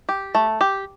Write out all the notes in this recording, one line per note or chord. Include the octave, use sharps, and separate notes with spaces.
G4
A3
G4